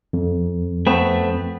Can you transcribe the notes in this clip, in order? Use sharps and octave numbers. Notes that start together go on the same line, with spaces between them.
F2
A3 B3 C4